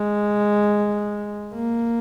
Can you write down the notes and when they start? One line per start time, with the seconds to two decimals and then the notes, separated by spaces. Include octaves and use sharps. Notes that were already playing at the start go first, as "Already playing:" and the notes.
Already playing: G#3
1.55 A#3